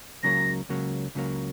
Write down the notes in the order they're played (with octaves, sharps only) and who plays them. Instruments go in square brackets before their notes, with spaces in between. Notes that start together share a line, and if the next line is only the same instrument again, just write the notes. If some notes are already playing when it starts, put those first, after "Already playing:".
[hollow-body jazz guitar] C#2 C#3 F#3 A#3 [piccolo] A#6
[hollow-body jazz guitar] C#2 C#3 F#3 A#3
C#2 C#3 F#3 A#3